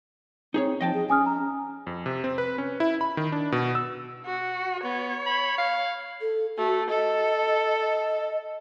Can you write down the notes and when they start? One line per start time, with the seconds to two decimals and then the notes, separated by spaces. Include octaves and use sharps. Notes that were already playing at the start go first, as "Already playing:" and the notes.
0.54 C4 D#4 G#4 C#5
0.81 F3 D#5 G5 A5
0.94 G#4
1.10 C#4 G#5 D#6 F6
1.26 A#5
1.87 F2
2.06 C3
2.24 C4
2.38 B4
2.58 C#4
2.80 E4
3.01 B5
3.17 D#3
3.32 D4
3.52 B2
3.75 E6
4.26 F#4
4.84 B3 C#5
5.26 B5
5.58 F5
6.21 A4
6.58 A3 F#4
6.89 A4 D#5
7.81 D#5